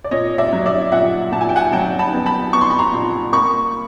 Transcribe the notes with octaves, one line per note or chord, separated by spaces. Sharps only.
D5
A#2 C#5 D#5
D5 E5
F#3
D5 E5
A#2 E5 F#5
A#2 A5
G#5
G5
F#5 G#5
F#3 G5 A5
A5 B5
B3
A5 B5
B3 C#6
C6
B5
A#5 C6
A#2
A#3 B5 C#6